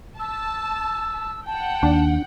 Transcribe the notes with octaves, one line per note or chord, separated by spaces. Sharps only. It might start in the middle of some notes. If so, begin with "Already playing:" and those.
A5 E6
F#5 G5 A5
D#2 D4